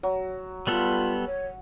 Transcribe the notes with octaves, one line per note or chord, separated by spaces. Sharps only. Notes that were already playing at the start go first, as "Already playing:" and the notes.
F#3
G3 B3 F4 A4
C#5